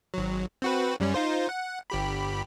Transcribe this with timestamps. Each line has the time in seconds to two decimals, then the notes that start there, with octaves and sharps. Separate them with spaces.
0.14 G#1 F#3
0.62 C4 F#4 B4
1.00 F#2 G3 C#4
1.14 D#4 F4 C5
1.49 F#5
1.90 G1 G4 B5